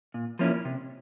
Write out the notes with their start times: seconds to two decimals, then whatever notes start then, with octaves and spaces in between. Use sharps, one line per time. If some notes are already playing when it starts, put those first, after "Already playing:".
0.14 A#2
0.39 F3 A#3 C#4 E4
0.65 C3